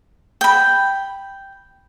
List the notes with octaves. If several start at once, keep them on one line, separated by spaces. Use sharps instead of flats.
G5 B5